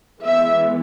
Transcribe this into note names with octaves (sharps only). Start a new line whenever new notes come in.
E3 G#3 B3 E5